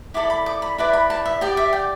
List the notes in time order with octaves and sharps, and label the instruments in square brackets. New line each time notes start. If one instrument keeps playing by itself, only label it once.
[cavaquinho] E4 A4 D5 D6
B5
D6
B5
E4 B4 D5 D6
B5
A5
E5
G4 D5 G5
E5
G5